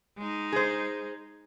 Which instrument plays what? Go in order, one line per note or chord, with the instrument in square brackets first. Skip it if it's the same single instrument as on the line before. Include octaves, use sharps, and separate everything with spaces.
[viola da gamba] G#3 D#4
[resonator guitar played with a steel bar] G#4 C5